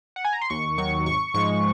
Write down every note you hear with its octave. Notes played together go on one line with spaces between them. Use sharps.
F#5
G#5
A#5
C6
D#2 C#6
D#3 F#3 C#6
G#1 C#6
G#2 F3 G#3 C#6